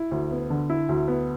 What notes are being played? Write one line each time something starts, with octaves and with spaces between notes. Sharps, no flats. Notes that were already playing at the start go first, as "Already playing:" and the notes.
Already playing: E4
D2
B3
D3
E4
D2
B3